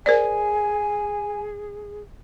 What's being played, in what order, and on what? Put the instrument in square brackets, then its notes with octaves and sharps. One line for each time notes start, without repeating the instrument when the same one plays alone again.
[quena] G#4 [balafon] A#4 C5 D5 [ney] G#5